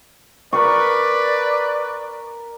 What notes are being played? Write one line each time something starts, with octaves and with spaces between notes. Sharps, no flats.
A#4 B4 D5 C#6